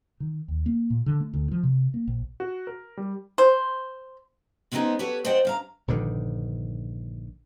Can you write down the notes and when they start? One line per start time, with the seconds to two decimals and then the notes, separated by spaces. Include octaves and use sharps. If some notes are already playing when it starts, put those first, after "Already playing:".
0.20 D#3
0.48 D#2
0.66 A#3
0.90 A#2
1.06 D3
1.20 A3
1.34 D2
1.52 F3
1.63 C3
1.94 A#3
2.08 A#1
2.40 F#4
2.67 A#4
2.97 G3
3.38 C5
4.72 G#3 B3 C4 D4 D#4 G#4
4.99 G4 A4 B4 C#5 F#5
5.25 C5 D5 D#5 F#5 G5
5.45 G2 F5 A#5
5.88 A#1 G2 D3 D#3